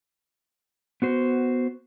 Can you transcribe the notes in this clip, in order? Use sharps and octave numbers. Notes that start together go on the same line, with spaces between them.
B3 F#4 C5